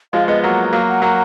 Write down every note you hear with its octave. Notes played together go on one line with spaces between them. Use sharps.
F3 G#3 F5
G#3 B3 D#5
F#3 A#3 F#5
F#3 A#3 F5
F#5
F#3 A#3